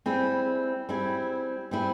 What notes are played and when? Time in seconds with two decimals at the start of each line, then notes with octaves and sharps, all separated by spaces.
0.06 G3 C4 E4 G#4
0.89 G3 C4 E4 G#4
1.71 G3 C4 E4 G#4